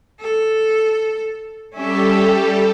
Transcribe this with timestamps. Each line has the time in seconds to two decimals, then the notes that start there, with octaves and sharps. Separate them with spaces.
0.21 A4
1.74 G3 C#4 G4 A4 E5